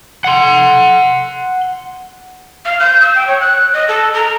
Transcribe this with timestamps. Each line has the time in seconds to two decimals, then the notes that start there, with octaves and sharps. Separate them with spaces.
0.24 F#5 C6
2.65 F5
2.80 G6
3.01 E6
3.15 G5
3.27 C#5
3.41 F#6
3.74 D#5
3.88 A4
4.14 A#5